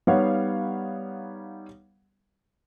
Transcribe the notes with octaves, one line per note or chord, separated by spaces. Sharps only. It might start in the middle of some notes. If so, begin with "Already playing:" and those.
G3 B3 D#4 C#5 F5 F#5